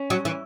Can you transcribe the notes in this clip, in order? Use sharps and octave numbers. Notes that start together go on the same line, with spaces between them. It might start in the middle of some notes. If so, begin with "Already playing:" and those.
Already playing: C#4
F#3
E3